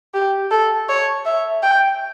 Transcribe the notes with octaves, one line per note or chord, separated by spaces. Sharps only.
G4
A4
C#5
E5
G5